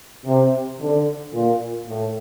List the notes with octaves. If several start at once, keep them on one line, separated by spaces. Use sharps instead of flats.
C3
D3
A#2
A2